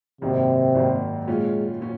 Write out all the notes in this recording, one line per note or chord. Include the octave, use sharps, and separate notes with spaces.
G#1 F#2 C3 D#3 A#3
G#1 F#2 D#3 A#3
A#2 F#3 G#3 C#4 F4
A#2 F#3 C#4